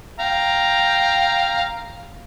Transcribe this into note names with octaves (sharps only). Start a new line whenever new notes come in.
F5 G5 A#5